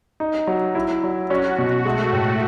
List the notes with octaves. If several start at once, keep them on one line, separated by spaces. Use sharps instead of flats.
D#4
F#3
E4
F#3
C#4 F#4
B2
G#3 A3
A2